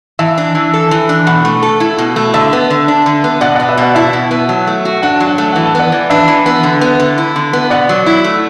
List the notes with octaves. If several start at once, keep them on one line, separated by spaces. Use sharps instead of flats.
E3 E5 A5
D4
E3
A4
E3
D4
B2 F#5 B5
A3
A4
E4
B2
A3
D3 E5 A5
B3
D3
D4
D3
B3
B2 D5 F#5
B3 D5 F#5
B4 E5
B2 D5 F#5
E4 E5 A5
B2
B3
F#3
A3
F#4
D4 F#5
F#3 A5
F#5
A3 A5
E3 F#5
A5
B3 D5 F#5
E3
D4 B4 E5
E3
B3
D3
B3
D3
E4
D3
B3
B2 D5 F#5
F#3
E4
A3